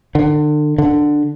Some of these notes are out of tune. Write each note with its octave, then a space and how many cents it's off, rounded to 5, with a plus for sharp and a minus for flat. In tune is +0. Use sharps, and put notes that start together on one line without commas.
D3 +35
D3 +10